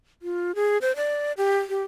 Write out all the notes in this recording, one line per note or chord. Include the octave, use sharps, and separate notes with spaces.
F4
G#4
C5
D5
G4
G4